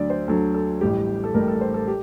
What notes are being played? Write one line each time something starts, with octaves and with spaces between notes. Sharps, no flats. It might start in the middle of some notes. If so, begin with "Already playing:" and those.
Already playing: D2 D3 F#3 D5
C5
D2 D3 F#3 A4
A4
A1 A2 G3 G4
A4
A1 A2 G3 A#4
A4
C5
A4
G4